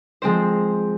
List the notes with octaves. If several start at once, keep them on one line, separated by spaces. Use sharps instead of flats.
F3 G#3 C4 C5